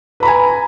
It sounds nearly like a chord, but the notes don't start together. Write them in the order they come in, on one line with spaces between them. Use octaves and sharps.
B4 B5 A#5 G#5